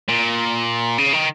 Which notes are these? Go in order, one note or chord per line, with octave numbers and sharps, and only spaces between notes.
A#2
C#3
D#3